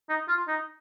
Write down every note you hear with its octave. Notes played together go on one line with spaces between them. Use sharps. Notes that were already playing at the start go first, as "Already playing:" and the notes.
D#4
F4
D#4